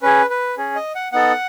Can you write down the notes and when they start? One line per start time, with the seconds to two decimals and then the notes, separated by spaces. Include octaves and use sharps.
0.02 C#4 G#4 B4
0.30 B4
0.57 C#4 G#4
0.76 D#5
0.95 F#5
1.12 B3 D#4 A4 F#5